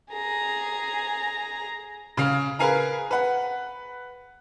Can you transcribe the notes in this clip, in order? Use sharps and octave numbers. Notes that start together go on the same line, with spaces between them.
G#4 A#5
C#3 F5
G#4 A#4 B4 F5 G#5 A#5
B4 F#5